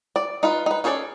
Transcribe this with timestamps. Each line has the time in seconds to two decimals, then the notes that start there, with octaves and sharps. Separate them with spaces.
0.16 D5
0.43 D#4 F4 B4
0.66 D#4 B4
0.84 C#4 G#4 A4 C5 D5